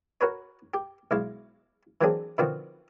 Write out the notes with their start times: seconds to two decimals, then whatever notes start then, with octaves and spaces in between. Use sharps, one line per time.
0.21 F#4 A#4 B4 C#5
0.74 G4
1.11 B1 G#3 E4 F5
2.01 E3 F#3 A#3 C4 D4 G#4
2.38 B2 D3 D#3 F3 C4 F#4